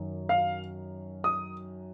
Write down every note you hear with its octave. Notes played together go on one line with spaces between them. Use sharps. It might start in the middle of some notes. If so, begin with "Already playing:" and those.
Already playing: F#2 D#3
F5
D#6